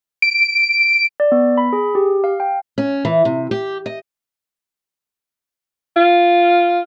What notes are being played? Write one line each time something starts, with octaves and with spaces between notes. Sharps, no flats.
D7
D5
B3
B5
G#4
G4
F5
G5
C#4
E3
C3
G4
D#5
F4